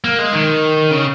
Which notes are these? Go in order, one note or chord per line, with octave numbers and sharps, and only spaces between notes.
A#3
G#3
D#3
C#3